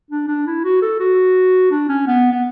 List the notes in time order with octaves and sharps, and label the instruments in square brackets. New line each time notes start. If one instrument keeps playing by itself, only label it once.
[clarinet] D4
D4
E4
F#4
A4
F#4
D4
C#4
B3
B3